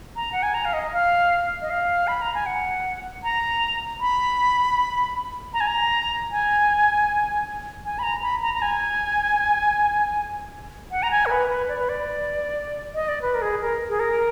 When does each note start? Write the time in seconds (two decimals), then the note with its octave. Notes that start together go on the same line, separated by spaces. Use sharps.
0.16 A#5
0.32 F#5
0.43 G#5
0.54 A#5
0.65 F5
0.73 D#5
0.93 F5
1.62 D#5
1.70 F5
2.08 B5
2.21 A#5
2.34 G#5
2.46 F#5
3.23 A#5
4.01 B5
5.53 A#5
5.61 G#5
5.68 A#5
6.31 G#5
7.85 G#5
7.99 B5
8.03 A#5
8.22 B5
8.42 A#5
8.54 A#5
8.62 G#5
10.91 F#5
11.03 A#5
11.11 G#5
11.26 A#4
11.30 B4
11.49 B4
11.68 D5
11.79 B4
11.89 D5
12.94 D#5
13.08 D5
13.22 B4
13.34 A#4
13.42 G#4
13.61 A#4
13.89 G#4
14.00 A#4